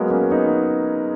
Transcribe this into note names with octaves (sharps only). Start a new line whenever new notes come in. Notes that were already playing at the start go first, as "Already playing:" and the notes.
Already playing: F#3 G#3 A#3 B3
A#3 C#4
B3 D#4